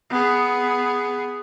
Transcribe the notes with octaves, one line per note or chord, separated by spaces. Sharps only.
B3 G#4